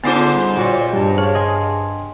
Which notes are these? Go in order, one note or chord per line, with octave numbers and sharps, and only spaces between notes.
G#2 D3 B3 C#4 D#4 F4 C5
G3
A#2 F#4 C#5 D5
G2 G3 A5
G#4 C#5 F5
D#5 G#5 C6